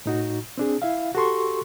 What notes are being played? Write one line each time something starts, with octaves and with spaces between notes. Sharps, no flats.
A2 D#4 F#4
C4 D4 G#4
E4 E5 F5
F#4 G4 A4 C6 C#6